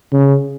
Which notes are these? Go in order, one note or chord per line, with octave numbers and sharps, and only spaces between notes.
C#3